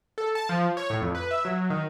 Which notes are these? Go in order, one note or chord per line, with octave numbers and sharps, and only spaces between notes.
A4
A5
F3
C#5
A2
F2
B4
E5
F#3
D#3